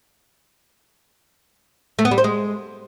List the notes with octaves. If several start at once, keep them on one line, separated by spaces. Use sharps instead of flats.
A3
B3
G3
C5
G#3